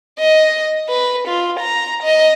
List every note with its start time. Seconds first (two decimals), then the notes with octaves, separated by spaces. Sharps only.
0.20 D#5
0.89 B4
1.28 F4
1.60 A#5
2.03 D#5